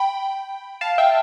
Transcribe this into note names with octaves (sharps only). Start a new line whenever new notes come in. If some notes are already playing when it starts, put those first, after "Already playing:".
Already playing: G5 B5
F5 A5
E5 G5